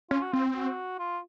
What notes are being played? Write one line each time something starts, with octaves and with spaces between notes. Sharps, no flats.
C#4 F4
F#4
C4 F4
F#4
F4